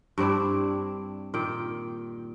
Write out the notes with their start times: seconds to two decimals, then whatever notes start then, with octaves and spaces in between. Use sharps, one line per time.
0.18 G2 C4 D4 E4
1.34 A#2 D#3 G5